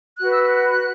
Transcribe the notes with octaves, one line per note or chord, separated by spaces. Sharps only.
F#4 B4 F#6
E6
F#6